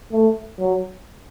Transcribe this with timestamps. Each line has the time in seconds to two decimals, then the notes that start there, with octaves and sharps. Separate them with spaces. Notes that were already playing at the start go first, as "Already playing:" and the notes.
0.12 A3
0.59 F#3